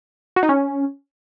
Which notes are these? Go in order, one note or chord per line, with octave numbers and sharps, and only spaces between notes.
F#4
D#4
C#4